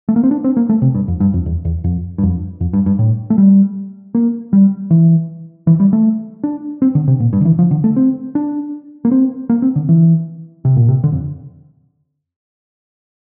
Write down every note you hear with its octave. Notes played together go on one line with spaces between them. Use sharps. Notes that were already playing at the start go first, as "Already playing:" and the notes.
A3
A#3
C4
D4
C4
A#3
A3
C3
G2
F2
G2
F2
E2
E2
F2
G2
F2
F2
G2
G2
A2
A3
G3
A#3
G3
E3
E3
G3
A3
D4
C4
D3
C3
A#2
G2
D3
E3
F3
D3
A3
C4
D4
A#3
C4
A#3
C4
D3
E3
C3
A#2
C3
D3
F2